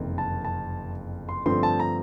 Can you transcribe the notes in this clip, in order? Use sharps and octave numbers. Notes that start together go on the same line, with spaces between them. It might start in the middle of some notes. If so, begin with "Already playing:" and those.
Already playing: F#1 F2 C3 D#3
A5
A5
C6
G2 D3 F3 A3 C4 C6
A5
A#5